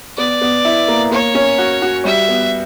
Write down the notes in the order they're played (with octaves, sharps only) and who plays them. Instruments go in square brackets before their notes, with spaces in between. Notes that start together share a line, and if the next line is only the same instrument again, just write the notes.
[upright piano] B3 [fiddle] D5
[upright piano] B3
E4
A#3
[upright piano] A#3 [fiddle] C#5
[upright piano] C#4
F#4
F#4
[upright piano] G3 [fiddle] E5
[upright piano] B3